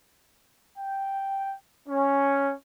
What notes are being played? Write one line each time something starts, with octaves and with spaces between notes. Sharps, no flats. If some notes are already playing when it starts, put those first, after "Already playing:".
G5
C#4